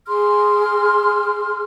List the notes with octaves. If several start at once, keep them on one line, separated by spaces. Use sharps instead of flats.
G#4 C6 F6